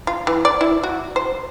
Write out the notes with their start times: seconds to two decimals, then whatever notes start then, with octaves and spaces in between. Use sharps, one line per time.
0.07 F4
0.27 E3
0.45 D5
0.61 E4
0.84 F#4
1.16 C5